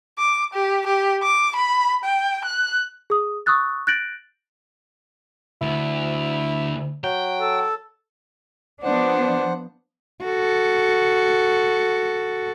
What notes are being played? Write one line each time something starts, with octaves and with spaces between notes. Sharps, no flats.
D6
G4
G4
D6
B5
G5
F#6
G#4 D#6
C#6 D#6 E6 F#6 A6
F#6 G6 A6 A#6 D7 F#7
D2 E4
F#3 G5
A4
F3 B3 D4 C5 F#5
F#4 A4